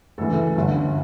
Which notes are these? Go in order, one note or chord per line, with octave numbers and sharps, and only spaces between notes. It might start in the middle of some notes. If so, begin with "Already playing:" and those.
D2 C#3 E3 A4
G1 G2 D3